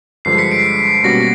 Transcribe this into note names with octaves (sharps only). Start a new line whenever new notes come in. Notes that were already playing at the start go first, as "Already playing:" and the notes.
G2 D3 F3 G#3 C7
B6 C#7
C7 D7
B2 G3 A#3 C#4 F#4 A#6